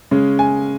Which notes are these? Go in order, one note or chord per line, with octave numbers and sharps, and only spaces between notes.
C#3 G#3 C#4
G#5